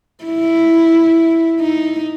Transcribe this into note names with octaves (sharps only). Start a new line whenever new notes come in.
E4
D#4